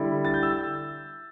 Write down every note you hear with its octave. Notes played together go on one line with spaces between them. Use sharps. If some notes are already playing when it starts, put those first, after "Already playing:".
Already playing: D3 G3 E4
A6
G6
E6